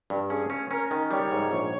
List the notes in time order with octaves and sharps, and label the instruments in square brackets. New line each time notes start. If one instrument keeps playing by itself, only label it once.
[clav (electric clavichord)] G2
[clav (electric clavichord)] C#4 [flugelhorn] G#4
[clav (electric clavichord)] C#4
[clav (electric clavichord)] C#4 [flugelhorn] A#4
[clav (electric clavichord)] D#3
[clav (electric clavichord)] G3 [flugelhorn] C#5
[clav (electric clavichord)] G#2
A#1